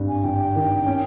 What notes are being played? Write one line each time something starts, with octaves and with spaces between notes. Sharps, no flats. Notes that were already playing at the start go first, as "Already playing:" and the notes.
Already playing: G#1 G2
G#5
G2 G5
D#3
C#4